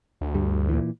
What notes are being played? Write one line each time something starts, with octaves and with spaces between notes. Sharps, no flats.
D2
G2 G3
A#2 E3